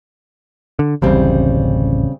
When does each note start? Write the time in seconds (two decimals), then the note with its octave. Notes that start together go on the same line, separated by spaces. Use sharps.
0.79 D3
1.02 D1 A1 C#3 G3 C4